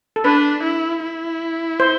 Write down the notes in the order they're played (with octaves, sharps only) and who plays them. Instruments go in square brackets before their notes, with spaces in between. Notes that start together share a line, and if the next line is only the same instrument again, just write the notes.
[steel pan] A4
[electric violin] D4 [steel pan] B4
[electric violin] E4
E4
[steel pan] C5